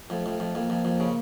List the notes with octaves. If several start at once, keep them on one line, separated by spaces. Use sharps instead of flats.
F2 A3
F2
F2
F2 A#3
F2
F2
C#3